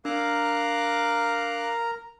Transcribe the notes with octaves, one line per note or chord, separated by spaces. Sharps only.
D4 A#4 F5 A#5 D6 F#6